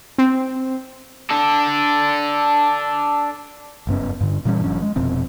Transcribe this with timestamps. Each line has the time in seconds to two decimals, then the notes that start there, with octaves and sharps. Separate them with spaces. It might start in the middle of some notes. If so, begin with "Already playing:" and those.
0.18 C4
1.30 D4 A4
3.87 F#1 G2 B3 C#4
4.21 G2 D3
4.45 A#2 E3 G3 C#4
4.64 G#1 G2 F3 C#4
4.82 G#3
4.96 F1 F2 B2 C4